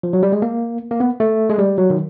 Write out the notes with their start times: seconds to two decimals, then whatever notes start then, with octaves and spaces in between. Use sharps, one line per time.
0.03 F3
0.13 F#3
0.23 G3
0.33 G#3
0.42 A#3
0.91 A#3
1.00 B3
1.20 A3
1.50 G#3
1.58 G3
1.78 F#3
1.90 D#3